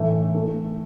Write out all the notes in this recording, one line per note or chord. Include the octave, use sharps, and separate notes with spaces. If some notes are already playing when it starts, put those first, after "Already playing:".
Already playing: A2 E3 A3
A3